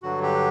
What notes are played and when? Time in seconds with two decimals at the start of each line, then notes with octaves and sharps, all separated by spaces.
0.02 G2 D3 F#3 F#4
0.23 G4